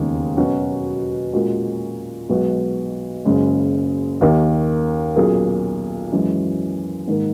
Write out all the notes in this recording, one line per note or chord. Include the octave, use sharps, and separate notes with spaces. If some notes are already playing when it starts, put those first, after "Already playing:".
Already playing: E1 D#2 C#3 G#3 D#4
B2 F#3 C#4 F#4
A#2 G#3 C#4 F#4 A#4
B1 B2 G#3 B3 F#4
F#1 F#2 C#3 G#3
D#2 D#3 A#3 D#4 A#4
B1 A#2 A#3 C#4 G#4
F#2 E3 G#3 C#4
G#2 D#3 A#3